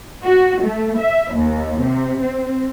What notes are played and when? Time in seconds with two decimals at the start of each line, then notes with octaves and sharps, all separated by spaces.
0.24 F#4
0.63 A3
0.99 E5
1.34 D#2
1.80 C3
2.22 C4